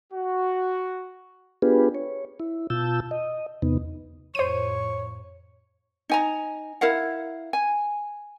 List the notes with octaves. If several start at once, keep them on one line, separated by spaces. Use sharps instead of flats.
F#4
B3 D4 F4 G4 G#4 B4
C#5
E4
B2 F4 A5 E6 G6
D#5
E2 C3 B3 D#4
F2 A2 C5 C#5 C#6 D#7
D#4 G#5 A#5
E4 A#4 F5 F#5
G#5